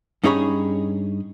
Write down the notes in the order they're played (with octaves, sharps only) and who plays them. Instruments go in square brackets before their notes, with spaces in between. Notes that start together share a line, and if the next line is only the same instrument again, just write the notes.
[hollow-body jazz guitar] G2 C#4 D#4 G#4 C#5 B5